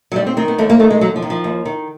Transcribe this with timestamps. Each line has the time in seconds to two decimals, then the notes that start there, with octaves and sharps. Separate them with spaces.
0.12 F#3
0.16 D#2 G3
0.27 C4
0.37 D#3 C4
0.48 B3
0.58 D#2 A3
0.70 A#3
0.80 D#3 A3
0.91 G#3
1.01 D#2 F#3
1.16 F3
1.22 D#3
1.30 F3
1.44 D#2
1.65 D#3